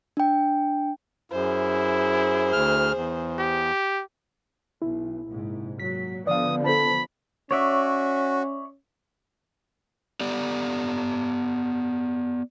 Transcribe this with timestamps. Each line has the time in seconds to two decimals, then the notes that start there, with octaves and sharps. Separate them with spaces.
0.17 D4 G5
1.32 F#2 E4 G#4 C5
2.53 D2 F6
2.96 E2
3.39 G4
4.82 B1 E4
5.28 A#1 G#2 C3
5.79 A#2 F#3 B6
6.27 D3 F3 B3 D5 F5 D#6
6.64 A4 C5 A5 B5
7.51 C#4 F#4 C#5 D5 E5
10.20 B3 G4 D5